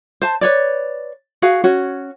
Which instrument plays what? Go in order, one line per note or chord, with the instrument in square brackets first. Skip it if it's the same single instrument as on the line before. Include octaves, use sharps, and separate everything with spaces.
[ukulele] C5 A5
B4 C#5 D5
F#4 G#4 F5
C#4 F#4 C#5